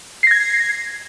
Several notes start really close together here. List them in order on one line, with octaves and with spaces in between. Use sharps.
C7 A#6 G#6